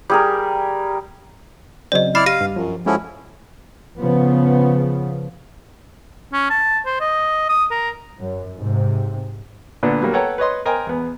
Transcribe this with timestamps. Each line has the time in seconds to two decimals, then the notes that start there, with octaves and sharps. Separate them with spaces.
0.10 G3 G#4 A#4
1.92 C#3 F#3 C4 D5 D#5
2.15 E4 D5 B5 F6 C7
2.26 G4 F5 A#6 D#7
2.41 G2
2.56 F#2 F3
2.86 F3 G#3 C#4 E4 F#4 A4
3.98 C#3 F3 B3
6.33 C#4
6.50 A5
6.86 C5
7.00 D#5
7.49 D#6
7.71 A#4
8.20 F#2
8.58 G#2 C3
9.83 A#2 D3 B3 D4
10.01 F#3 G3 A#3
10.13 A4 B4 C#5 F#5 G5 A#5
10.38 B4 C#5 D#5 C6
10.66 A#4 C5 D#5 G5 G#5 A#5
10.87 E2 B3